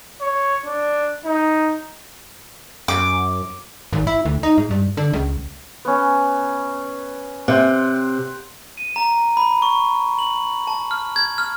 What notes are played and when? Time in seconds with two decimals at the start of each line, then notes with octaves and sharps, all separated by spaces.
0.21 C#5
0.65 D4
1.25 D#4
2.88 F#2 D6
3.93 G#1
4.07 E4
4.25 D2
4.43 D#4
4.58 G#2
4.71 G2
4.97 D3
5.13 C#2
5.85 B3 C#4
7.48 C3 F#5 G5 C6
8.78 D#7
8.96 A#5
9.37 B5
9.62 C#6
10.19 F#7
10.67 A5
10.91 F6
11.16 G#6
11.38 F6